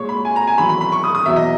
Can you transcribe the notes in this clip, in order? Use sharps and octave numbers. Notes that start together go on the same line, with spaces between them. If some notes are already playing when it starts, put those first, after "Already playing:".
Already playing: A#2 G#3 C#5
B5
G#5
A#5
G#5
E2 D#3 F#3 B5
B5
B5
C#6
D#6
D#6
E2 B2 F#3 E5
D#5